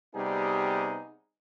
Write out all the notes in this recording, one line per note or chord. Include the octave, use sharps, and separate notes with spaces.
C3 G3 B3 D#4 G#4